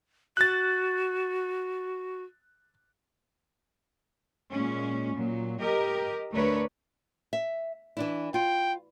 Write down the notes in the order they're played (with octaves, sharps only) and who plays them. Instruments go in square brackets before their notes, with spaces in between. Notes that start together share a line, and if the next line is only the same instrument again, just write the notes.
[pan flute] F#4 [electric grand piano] F#6 A6
[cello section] A#2 G#3 C#4
A#2 F#3
G4 A#4 D#5
D2 A3 D4 A#4 B4 C#5
[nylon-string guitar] E5
E3 D4 E4
[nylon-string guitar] F4 [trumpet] G5